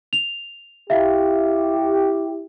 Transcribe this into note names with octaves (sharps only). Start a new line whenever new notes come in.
F7
E4 G4 E5 F5